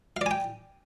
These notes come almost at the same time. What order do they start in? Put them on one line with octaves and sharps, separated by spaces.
F5 D5 G#5 G5